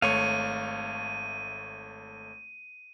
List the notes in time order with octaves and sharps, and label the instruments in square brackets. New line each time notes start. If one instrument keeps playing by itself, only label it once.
[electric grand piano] G#1 A3 C#5 [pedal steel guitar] F5 C#6 [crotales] D#7